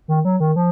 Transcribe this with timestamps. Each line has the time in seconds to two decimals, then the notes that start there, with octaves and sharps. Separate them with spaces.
0.08 D#3
0.25 F#3
0.40 D#3
0.56 F3